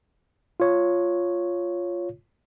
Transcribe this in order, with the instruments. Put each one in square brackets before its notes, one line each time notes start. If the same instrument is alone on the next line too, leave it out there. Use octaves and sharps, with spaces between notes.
[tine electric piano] F4 C#5